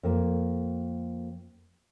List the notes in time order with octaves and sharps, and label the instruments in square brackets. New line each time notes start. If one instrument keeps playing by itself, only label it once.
[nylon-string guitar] F2 A#3